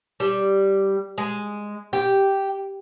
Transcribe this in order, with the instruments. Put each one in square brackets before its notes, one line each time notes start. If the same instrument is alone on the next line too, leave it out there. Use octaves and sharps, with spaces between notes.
[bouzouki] G3
G#3
G4